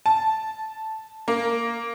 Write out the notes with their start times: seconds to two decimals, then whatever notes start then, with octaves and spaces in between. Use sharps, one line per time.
0.06 A5
1.28 A#3